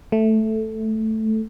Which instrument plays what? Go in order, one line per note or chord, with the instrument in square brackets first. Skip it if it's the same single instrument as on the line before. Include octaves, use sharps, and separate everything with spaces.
[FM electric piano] A3